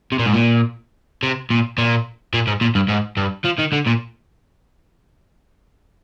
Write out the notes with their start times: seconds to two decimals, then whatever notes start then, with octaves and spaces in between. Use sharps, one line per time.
0.12 C3
0.19 A#2
0.26 G#2
0.34 A#2
1.23 C3
1.50 A#2
1.78 A#2
2.34 A#2
2.47 G#2
2.61 A#2
2.75 G2
2.89 G#2
3.17 G2
3.44 F3
3.58 D#3
3.72 D3
3.86 A#2